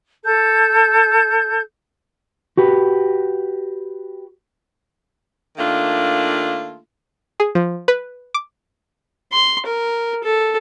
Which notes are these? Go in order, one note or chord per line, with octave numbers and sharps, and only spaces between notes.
A4 G6
F#4 G4 B4
D#3 A3 A#3 D4 F4
G#4
F3
B4
D6
C6
A#4
A4